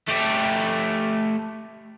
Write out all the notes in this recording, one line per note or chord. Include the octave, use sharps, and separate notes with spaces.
A3 G4